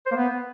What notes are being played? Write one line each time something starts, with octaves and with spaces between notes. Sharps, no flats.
C5
A#3
B3